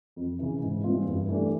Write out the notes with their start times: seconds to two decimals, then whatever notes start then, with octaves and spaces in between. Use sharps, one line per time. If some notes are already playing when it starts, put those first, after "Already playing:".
0.16 F2
0.39 C#3 E3
0.62 G#2
0.84 E3 G3 C4 F4
1.06 G2
1.29 E3 A3 D4 G4